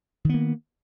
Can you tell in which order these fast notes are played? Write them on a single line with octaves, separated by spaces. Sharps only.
D#3 B3 A#3